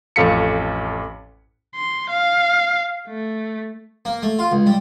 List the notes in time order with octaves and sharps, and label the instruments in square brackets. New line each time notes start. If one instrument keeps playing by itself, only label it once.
[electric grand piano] A1 F2 A4 F5 B6 C#7
[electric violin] C6
F5
A3
[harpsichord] A#3
A3
F4
C#2
G3